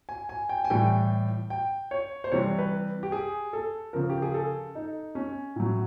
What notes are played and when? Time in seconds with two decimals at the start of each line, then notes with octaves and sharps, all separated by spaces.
0.09 G#5
0.29 G#5
0.49 G5
0.65 G#5
0.70 A2 E3 G3 G5
1.50 G5
1.91 C#5
2.24 C5
2.32 C3 E3 G3 C#5
2.58 B4
3.03 G4
3.12 G#4
3.53 A4
3.93 C#3 F3 A#4
4.09 G4
4.22 G#4
4.34 A4
4.75 D#4
5.15 C#4
5.56 A2 F#3